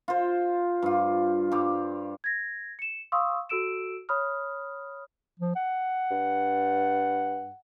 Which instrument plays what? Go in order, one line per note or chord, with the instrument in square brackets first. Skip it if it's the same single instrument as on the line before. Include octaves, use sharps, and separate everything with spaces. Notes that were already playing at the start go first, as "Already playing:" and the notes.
[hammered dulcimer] F4 C5
G2 F4
G2 G4
[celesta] G#6 A#6
C#7 E7
F5 C6 C#6 D#6 E6
F#4 A4 E6 D7 E7
C#5 B5 D#6 F6
[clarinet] F3
F#5
[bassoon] G2